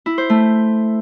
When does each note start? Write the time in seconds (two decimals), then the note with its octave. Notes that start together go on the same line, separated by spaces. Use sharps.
0.06 E4
0.18 C5
0.30 A3